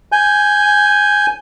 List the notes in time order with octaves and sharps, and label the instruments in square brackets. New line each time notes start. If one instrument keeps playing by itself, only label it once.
[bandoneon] G#5 G6